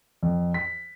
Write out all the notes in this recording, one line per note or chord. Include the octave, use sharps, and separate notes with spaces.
F2
B6